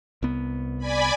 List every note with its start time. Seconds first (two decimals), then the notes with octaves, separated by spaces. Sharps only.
0.23 C2 B3
0.78 D5 G#5 B5